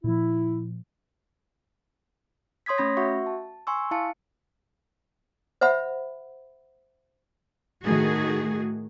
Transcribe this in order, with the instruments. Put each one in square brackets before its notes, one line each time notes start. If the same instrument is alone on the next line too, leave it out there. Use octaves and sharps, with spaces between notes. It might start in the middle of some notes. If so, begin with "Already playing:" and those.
[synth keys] A#2 F3 [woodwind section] E4
[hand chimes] C#5 C6 D#6 G#6 B6
A3 C#4 B5 A#6
F#4 E5 F#5 C#6
A5
G#5 C6 C#6 E6
E4 F5 A5 C#7
[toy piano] C5 E5 F#5 B5
[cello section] A2 D#3 A3 F#4 G#4